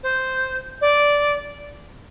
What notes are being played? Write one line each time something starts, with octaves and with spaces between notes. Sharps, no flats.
C5
D5